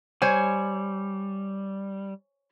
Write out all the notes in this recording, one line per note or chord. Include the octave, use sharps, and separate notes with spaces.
G3 C5 C#5 G#5